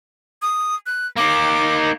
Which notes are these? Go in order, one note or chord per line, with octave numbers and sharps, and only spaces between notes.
D#6
F#6
A#3 D#4 D6